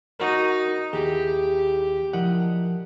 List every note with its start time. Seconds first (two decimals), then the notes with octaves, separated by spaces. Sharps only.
0.20 D#4 F#4 A#4
0.93 D#2 E4 G4 G#4
2.13 F3 E4 A#4 D5 D#5 F#5